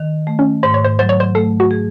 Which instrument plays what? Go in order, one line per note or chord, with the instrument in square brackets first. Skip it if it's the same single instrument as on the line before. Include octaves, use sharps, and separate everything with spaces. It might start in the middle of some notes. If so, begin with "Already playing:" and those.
Already playing: [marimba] D#3
A3
[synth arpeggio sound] C#4
[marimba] G#2 [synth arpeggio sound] C5
[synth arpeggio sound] C#5
C5
[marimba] F#3 [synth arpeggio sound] C5
[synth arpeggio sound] C#5
C5
[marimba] A3 [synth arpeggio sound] A4
[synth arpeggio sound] F#4
[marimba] G#4